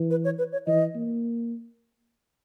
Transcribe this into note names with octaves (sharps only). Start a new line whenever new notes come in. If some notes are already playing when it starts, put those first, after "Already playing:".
Already playing: E3
B4
C#5
B4
C#5
E3 D#5
A#3